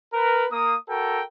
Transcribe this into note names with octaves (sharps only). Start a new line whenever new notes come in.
A#4 B4
A#3 D#6
F#4 A4 A#4 G5